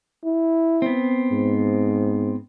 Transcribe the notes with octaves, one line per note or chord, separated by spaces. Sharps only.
E4
B3 C4
G#2